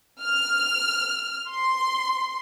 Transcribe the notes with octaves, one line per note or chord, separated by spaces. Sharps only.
F6
C6